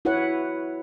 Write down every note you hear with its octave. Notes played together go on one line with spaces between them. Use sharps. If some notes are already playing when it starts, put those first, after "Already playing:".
E4 F#4 B4 C#5 F#5